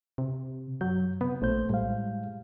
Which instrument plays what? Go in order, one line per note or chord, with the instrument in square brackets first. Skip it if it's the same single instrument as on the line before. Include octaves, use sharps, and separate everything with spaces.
[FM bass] C3
[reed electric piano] F#2 G6 [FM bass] F#3
[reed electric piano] C3 [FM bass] B3
[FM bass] A#1 [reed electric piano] A3 C5 G6
[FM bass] A2 [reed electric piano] G3 G#3 F5